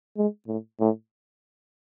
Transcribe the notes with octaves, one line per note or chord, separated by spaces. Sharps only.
G#3
A2
A2